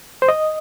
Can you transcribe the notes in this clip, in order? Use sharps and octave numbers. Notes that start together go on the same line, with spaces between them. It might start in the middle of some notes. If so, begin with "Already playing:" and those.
C5
D#5